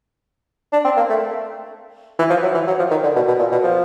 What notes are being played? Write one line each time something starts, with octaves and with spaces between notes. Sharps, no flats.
D4
C4
A#3
A3
E3
F3
F#3
E3
F#3
F3
D#3
D3
B2
B2
A#2
B2
F3